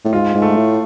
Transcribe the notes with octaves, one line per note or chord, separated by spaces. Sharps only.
A2
G#2 F4
G#2
A3
A2